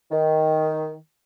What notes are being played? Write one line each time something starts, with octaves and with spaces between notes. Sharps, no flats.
D#3